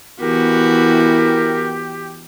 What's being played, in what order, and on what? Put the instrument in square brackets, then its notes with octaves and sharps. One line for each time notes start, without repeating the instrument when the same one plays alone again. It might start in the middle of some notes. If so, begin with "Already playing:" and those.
[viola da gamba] E3 B3 F#4 [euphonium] E4 [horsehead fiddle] G4 [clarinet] A#4